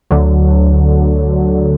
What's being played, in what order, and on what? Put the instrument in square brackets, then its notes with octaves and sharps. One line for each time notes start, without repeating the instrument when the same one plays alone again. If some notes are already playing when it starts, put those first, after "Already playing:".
[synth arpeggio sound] D2 D3 F#3